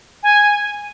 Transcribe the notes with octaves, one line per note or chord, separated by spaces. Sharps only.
G#5